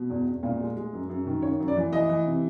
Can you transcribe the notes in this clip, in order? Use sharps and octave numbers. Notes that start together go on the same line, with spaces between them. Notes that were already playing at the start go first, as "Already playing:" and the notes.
Already playing: B2
E2
E2
A#2 F5
G#3
G#3
F#2
F#2
D#3
C#3 C#5
F#2
D5
E3
E3 D#5
E3
C3